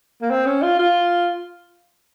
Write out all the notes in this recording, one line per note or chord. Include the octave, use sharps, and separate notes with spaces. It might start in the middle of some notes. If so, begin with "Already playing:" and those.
A#3
C4
C#4
F4
F4